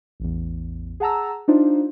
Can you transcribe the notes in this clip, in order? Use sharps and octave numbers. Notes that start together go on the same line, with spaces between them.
A1 E2
G#4 F#5 A5 A#5 E6
D4 D#4 F4 C5